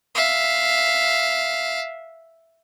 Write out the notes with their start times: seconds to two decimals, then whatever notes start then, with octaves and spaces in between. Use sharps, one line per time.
0.15 E5 F5